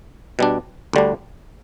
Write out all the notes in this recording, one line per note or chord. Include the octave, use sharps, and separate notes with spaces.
B2 G3 D4
D2 D3 G3 D4